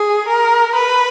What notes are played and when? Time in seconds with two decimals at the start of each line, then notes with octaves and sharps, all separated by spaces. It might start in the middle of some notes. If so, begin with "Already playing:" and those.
Already playing: G#4
0.28 A#4
0.75 B4